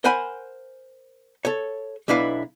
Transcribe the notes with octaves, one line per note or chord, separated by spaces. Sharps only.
A#4 C5 F#5 G#5 B5
A4 C#5
B1 B2 D4 E4 B4 F5